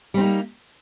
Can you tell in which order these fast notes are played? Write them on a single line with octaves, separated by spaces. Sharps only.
G3 C4 D#4 A#3